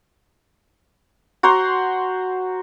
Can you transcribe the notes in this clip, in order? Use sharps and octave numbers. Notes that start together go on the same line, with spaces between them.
F#4 C5 A#5 C6